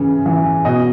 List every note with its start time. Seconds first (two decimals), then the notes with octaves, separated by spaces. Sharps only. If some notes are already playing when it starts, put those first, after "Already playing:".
Already playing: C#3 E3
0.26 E3
0.65 B2 D#5